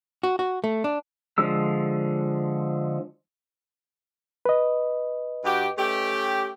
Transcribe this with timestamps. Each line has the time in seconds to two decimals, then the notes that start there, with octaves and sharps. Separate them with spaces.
0.23 F#4
0.39 F#4
0.64 A3
0.84 D4
1.38 D3 F3 G#3 E6
4.46 B4 D#5
5.45 G2 F#4 G4
5.78 A3 C#4 G4